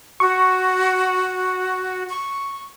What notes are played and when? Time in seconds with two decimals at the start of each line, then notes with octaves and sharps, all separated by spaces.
0.20 F#4 C#6
2.09 C#6